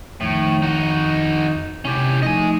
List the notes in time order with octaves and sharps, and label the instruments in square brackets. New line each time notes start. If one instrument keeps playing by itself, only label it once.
[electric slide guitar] F2 D#3 [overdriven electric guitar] A2
[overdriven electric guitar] D#4 F#4
[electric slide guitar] C3 E4 [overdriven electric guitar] C#4 G4
[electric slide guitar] F3 A3 D#4 [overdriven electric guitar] D#5 G#5